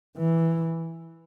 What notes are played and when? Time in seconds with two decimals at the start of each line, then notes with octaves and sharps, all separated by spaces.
0.17 E3